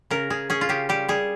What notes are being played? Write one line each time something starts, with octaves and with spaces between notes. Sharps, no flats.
C#3 A#4
C#3 G#4
C#4 G#4
F4
C#3 G4
G3 G4
G3 G#4